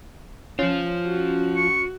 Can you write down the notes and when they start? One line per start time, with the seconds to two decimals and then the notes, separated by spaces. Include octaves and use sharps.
0.59 F3 C#4 F4
1.05 F#4
1.57 C#6